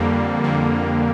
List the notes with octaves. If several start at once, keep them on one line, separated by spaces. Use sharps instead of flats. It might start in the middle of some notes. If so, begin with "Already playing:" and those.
Already playing: F2 D3 G3 A#3
F2 D3 G3 A#3